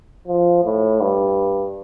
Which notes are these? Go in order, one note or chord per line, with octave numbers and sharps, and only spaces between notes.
F3
A2
G2